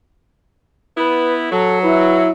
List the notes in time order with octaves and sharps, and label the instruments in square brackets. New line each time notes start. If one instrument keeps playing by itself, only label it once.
[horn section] B3 E4 [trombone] B4
[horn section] F#3 [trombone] A4
[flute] E4 [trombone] B4